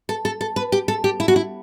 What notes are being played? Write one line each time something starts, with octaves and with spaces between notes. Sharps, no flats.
A4
A4
A4
B4
G4
A4
G4
E4
F#4
E4